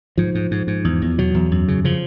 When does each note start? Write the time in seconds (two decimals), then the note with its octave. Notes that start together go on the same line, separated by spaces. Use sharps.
0.18 G#2 F3
0.35 G#2
0.51 G#2
0.67 G#2
0.84 E2
1.02 E2
1.18 B2 F#3
1.34 E2
1.51 F#2
1.68 C#3
1.84 C#3 F3